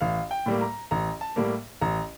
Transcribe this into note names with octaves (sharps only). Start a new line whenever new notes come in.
A1 F5
G5
A2 G3 A#3
A#5
A1 A#5
A5
A2 G3 A#3
A1 A#5